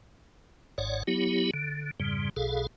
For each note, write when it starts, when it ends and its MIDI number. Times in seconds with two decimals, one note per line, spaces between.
0.78 1.03 32
0.78 1.03 44
0.78 1.03 73
0.78 1.03 74
0.78 1.03 78
1.07 1.51 54
1.07 1.51 59
1.07 1.51 64
1.07 1.51 67
1.54 1.91 50
2.00 2.30 41
2.00 2.30 44
2.00 2.30 49
2.00 2.30 55
2.36 2.67 35
2.36 2.67 47
2.36 2.67 68
2.36 2.67 69
2.36 2.67 77